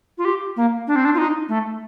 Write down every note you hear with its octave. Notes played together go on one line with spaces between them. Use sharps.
F4
G4
A#3
D4
C4
D4
F4
D#4
A3